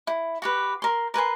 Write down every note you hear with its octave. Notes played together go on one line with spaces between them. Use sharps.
E4
F#4 G4 B4
A#4 C6
A#4 B4 G#5 C6